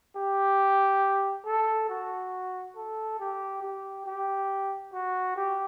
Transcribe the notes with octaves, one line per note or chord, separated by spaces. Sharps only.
G4
A4
F#4
A4
G4
G4
G4
F#4
G4